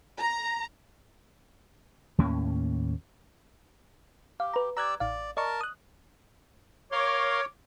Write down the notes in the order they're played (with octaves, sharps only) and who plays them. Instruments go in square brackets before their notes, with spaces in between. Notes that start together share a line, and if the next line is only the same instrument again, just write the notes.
[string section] A#5
[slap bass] D#2 A2 A#3 C#4
[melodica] G4 [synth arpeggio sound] F5
[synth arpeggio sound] B4 A#5
[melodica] G4 D5 E6 [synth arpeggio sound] A#5 F#6 G#6
[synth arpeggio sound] A1 F5 [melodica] D5
[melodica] A#4 A5 [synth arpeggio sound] D5 D#5 C#6
[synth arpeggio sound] D#6 F#6
[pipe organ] A#4 F5 C6 [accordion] C#5 [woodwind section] D6